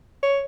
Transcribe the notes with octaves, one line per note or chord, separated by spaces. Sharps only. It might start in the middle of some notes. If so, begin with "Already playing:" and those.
C#5